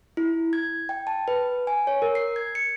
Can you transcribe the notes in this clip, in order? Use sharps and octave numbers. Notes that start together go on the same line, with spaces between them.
E4
G#6
G5
A5
B4
G#5
C#5
A#4
C7
G#6
C#7